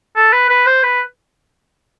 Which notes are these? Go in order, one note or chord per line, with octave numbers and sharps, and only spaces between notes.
A4
B4
B4
C5
B4